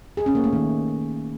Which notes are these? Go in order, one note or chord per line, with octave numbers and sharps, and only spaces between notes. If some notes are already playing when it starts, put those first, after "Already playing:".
G#4
C#4
A#3
A3
D#3